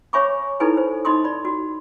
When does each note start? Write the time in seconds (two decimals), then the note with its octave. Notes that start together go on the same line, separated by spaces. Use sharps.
0.13 C#5 E5 G#5 B5 C#6 D6
0.60 D#4 E4 A4 B4 G#5 B5
0.77 C5
1.05 D#4 D#5 B5 C6 D#6
1.24 D5 B5
1.45 F#4